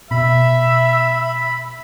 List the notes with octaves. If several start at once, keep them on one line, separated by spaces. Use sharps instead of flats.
B2 E5 B5